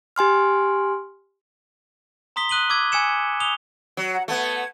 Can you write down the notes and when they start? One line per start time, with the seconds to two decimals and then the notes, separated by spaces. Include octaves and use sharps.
0.16 G4 G#5 C6 F6
2.36 A#5 C6 D#6 B6 G7
2.49 D#6 F#6 D#7 F#7 G7
2.70 D6 E6 G#6
2.92 G#5 E6 G#6 C#7 E7
3.40 D#6 F7 G7
3.97 F#3
4.14 F#5 A#5
4.28 A3 B3 F#5 G#6